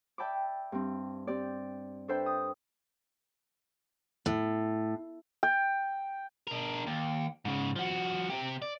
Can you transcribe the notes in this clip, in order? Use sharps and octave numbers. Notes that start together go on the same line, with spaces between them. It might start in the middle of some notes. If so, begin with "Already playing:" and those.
D5 E5 G5 A5 B5 D6
G2 C4
C4 G4 D5
D4 A4 B4 C5 E5 G5
D#6
A2
G5
D4 A#4
D#2
G#2 C#3
F3 F#4
C3 G4
D5